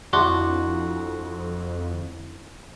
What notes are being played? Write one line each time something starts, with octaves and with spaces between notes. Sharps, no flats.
F2 D4 E4 F#4 C6 D6